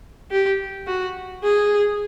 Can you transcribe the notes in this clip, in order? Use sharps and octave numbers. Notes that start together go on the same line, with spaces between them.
G4
F#4
G#4